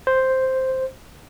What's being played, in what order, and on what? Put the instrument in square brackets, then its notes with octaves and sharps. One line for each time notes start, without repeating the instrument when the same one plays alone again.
[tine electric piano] C5